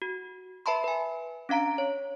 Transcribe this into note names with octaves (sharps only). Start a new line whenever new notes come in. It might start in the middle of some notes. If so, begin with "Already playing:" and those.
F#4
B4 E5 A5 B5 C6
B4 G#5
C#4 D4 F5 A#5 D7
C#5